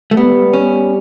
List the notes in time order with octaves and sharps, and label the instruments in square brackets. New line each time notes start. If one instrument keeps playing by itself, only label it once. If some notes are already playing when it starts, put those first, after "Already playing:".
[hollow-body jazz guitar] A3
[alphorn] G3 [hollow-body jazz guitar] B3
[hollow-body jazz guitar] C#4